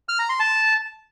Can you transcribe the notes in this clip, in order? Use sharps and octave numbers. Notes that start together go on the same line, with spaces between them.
F6
A#5
C6
A5